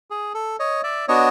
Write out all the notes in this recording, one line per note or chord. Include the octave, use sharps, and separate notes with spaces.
G#4
A4
C#5 D#5
D5 E5
B3 D4 F#4 C#5 D#5